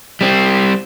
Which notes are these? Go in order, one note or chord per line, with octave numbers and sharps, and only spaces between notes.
G3 C4